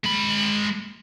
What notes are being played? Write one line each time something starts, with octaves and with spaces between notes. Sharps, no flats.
G#3 B5